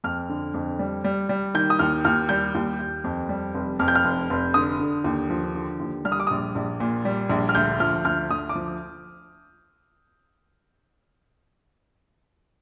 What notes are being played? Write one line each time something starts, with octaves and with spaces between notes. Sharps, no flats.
F2 F6
D3
F2
G3
G3
G3
D#3 G6
D#6
D#2 F6
D#2 F6
G3 G6
D#2
D#2
F2
G3
F1
F2 F6
G6
F6
F1
F1
D3 D#6
D3
D#2
F3
D3
D#2
G3 F6
D#6
D6
A#1 D#6
A#1
A#2
G3
A#1
F6
D2 G6
F3 F6
D2 F6
D2 D#6
D6
F3